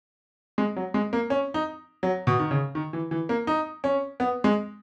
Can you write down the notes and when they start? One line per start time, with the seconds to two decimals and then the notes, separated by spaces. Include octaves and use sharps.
0.58 G#3
0.76 F#3
0.94 G#3
1.13 A#3
1.30 C#4
1.54 D#4
2.03 F#3
2.27 B2
2.39 D#3
2.51 C#3
2.75 D#3
2.93 E3
3.11 E3
3.29 A#3
3.47 D#4
3.84 C#4
4.20 B3
4.44 G#3